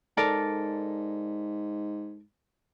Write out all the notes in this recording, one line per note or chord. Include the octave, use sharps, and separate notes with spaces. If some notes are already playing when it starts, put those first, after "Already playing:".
G#2 A4 A#4 D5